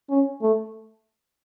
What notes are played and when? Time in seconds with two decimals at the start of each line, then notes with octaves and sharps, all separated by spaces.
0.10 C#4
0.42 A3